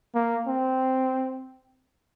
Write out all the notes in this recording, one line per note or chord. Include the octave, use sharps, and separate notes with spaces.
A#3
C4